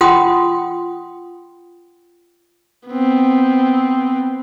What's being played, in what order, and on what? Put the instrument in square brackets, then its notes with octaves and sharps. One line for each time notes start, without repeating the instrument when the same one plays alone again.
[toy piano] F4 F#5 G5 C6 D#6
[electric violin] B3 C4